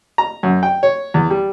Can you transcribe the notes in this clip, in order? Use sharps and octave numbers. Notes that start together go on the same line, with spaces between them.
A#5
F#2
G5
C#5
E2
G3